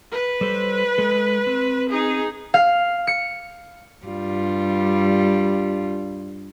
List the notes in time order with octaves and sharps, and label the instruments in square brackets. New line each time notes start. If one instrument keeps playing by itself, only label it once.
[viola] B4
[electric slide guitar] G3 A4 C5
G#3 A4
C4
[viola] D#4 G#4
[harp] F5
C#7
[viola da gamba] G2 G3 F4